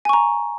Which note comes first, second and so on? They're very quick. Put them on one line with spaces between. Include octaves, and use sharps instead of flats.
G#5 C#6 A#5